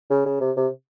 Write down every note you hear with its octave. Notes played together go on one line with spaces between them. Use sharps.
C#3
C#3
C3
C3